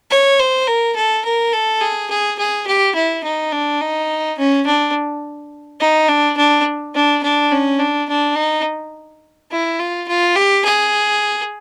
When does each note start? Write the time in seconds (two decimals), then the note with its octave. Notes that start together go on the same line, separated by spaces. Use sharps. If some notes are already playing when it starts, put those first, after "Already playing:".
0.10 C#5
0.39 C5
0.67 A#4
0.96 A4
1.25 A#4
1.52 A4
1.81 G#4
2.10 G#4
2.39 G#4
2.67 G4
2.95 E4
3.24 D#4
3.52 D4
3.81 D#4
4.38 C#4
4.66 D4
5.80 D#4
6.08 D4
6.37 D4
6.94 D4
7.23 D4
7.52 C#4
7.79 D4
8.09 D4
8.36 D#4
9.51 E4
9.79 F4
10.08 F4
10.36 G4
10.65 G#4